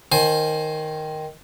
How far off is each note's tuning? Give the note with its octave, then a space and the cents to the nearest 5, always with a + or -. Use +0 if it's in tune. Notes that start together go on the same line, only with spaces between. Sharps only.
D#3 +0 C5 +10 G#5 +25